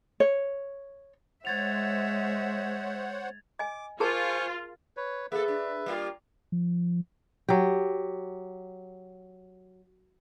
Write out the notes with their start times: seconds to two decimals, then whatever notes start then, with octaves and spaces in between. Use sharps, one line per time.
0.20 C#5
1.45 G#3 C5 C#5 E5 F#5 G#6 A6 F7
3.59 D#5 G#5 D6
4.00 F4 G#4 A#4 C5 G#5 A5 C#6
4.97 B4 C#5
5.32 A#3 G#4 A4 B4 E5
5.48 D4
5.86 G3 A#3 F4
6.52 F3
7.49 F#3 G4